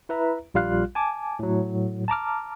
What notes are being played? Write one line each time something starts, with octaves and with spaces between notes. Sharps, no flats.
E4 B4 E5 A#5
A#1 G3 F4 F5 F#6
G#5 A5 D6
A2 F#3
A5 A#5 D6 F6